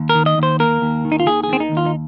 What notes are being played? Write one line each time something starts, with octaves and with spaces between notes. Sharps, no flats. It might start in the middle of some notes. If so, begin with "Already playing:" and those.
Already playing: D#2
A#4
D#3
D#5
D#2 C5
A#3 A#4
D#2
D#3
D#4
F4
D#2 G#4
G#4
D#3 C4
D#4
D#2
F4
D#4